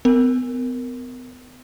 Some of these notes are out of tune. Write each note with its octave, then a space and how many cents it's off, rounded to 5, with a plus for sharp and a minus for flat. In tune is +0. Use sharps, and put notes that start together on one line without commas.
B3 +40 A#4 -10